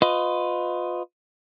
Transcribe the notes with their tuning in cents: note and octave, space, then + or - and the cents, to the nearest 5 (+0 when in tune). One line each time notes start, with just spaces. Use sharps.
F4 +25 B4 +30 D#5 +0